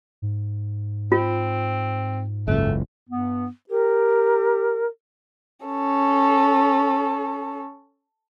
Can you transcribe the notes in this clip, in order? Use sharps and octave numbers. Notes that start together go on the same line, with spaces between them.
G#2
C4 F4
F#1 C#2 A3
G2 B3
G4 A#4
C#4 A4